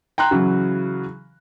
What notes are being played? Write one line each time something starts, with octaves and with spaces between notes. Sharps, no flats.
G5 A#5 C6 F#6
C#3 E3 F#3